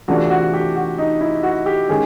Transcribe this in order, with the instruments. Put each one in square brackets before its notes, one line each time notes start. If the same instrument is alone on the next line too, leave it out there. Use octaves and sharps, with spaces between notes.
[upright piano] C3 E3 A3 D4 F4 [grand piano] F#4
[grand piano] F#4
G4
F#4
D#4
E4
F#4
G4
[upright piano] D#3 G#3 C#4 [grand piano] G#4